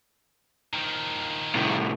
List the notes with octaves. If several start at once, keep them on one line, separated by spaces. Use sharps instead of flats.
D#3 F3
C2 A2